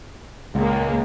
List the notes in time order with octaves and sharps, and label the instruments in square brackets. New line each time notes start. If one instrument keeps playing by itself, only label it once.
[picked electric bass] C#2 [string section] A#2 G#3 A#3